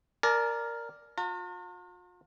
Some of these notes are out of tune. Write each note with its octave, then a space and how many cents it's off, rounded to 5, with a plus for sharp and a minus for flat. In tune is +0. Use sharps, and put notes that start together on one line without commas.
A#4 +0 D5 +0 A5 -40
F4 +40 A#5 -45